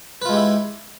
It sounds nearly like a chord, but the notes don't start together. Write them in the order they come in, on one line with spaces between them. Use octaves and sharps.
B4 F4 G#3 G4 E4